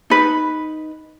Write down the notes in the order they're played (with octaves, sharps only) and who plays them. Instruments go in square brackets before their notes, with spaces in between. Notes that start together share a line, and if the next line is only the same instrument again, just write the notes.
[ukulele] D#4 B4